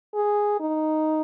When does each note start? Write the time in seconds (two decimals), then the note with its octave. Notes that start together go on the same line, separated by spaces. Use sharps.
0.14 G#4
0.60 D#4